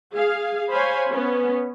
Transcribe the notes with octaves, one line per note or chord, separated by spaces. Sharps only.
G#4 F5
C5 C#5 F5 G#5 B5
B3 C#4